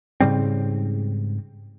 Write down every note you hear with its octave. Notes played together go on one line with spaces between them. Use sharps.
G#2 C#3 G3 C4